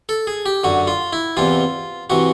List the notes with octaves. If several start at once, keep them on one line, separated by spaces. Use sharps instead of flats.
A4
G#4
G4
F#2 D3 F#4
F4
E4
E2 C3 E3 F4
C3 E3 F#4